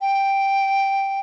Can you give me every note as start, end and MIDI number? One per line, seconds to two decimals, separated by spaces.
0.01 1.20 79